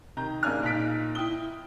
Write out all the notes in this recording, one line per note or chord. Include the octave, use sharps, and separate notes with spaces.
C3 D#3 A#5 G6
G#2 C#3 A#3 D4 G#5 F6
A#2 D#4 F#6 B6 D7
E4 G5 D#6 G7